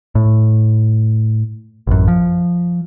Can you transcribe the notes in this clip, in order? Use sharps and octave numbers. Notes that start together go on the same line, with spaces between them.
A2
A1 F#2
F3